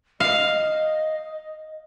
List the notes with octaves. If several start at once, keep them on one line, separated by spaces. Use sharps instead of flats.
D#5 F5